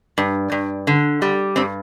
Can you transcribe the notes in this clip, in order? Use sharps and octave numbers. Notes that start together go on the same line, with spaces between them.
G2
G2
D3
G3
G2 C4